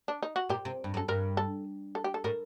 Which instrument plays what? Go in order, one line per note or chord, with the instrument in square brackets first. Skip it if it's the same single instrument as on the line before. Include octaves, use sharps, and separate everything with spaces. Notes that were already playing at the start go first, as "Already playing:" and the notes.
[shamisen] D4
D#4
F#4
[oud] A#2 [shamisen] G4
[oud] C3
G2
F#2
[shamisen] A4
[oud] G2 [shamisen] A#4
[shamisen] A4
A4
G4
A4
[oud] A2 [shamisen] A#4